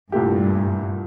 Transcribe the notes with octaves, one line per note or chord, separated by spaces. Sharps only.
C2 G2 A#2 A3 E4 G4